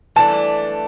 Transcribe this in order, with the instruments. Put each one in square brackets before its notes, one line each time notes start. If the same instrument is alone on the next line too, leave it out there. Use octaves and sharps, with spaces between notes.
[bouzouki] E3 A3 D4 [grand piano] A5